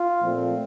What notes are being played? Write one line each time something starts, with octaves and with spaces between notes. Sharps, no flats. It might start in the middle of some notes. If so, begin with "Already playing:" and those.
Already playing: F4
A#2 F3 A3 C4